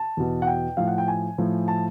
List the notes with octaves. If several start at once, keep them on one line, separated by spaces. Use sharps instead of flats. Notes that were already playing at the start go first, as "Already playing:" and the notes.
Already playing: A5
E2 B2
F#5
G5
A2 F3 F5
F#5
G5
G#5
A2 F3
A5